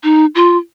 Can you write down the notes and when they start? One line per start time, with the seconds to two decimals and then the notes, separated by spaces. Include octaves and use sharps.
0.03 D#4
0.35 F4